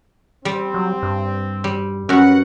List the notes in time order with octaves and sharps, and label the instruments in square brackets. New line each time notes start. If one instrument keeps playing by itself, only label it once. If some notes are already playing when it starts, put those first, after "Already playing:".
[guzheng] G3 [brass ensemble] C4
[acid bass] F#3
G2
[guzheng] G3
[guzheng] F#2 F#4 [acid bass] C#4 [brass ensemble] B4 F#5